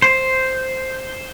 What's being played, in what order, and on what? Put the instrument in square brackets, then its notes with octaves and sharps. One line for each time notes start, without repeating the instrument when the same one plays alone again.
[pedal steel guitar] C5